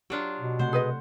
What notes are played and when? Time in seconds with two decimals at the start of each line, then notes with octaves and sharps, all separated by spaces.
0.10 F#3 D4 F4 G4
0.40 B2
0.59 C3 A3 C5 F#5
0.73 G#4 B4 D#5